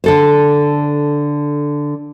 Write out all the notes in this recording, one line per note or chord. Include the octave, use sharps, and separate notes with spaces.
D3 A4 C5